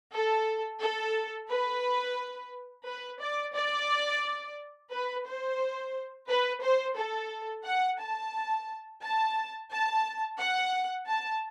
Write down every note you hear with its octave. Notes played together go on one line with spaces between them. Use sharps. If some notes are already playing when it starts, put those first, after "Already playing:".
A4
A4
B4
B4
D5
D5
B4
C5
B4
C5
A4
F#5
A5
A5
A5
F#5
A5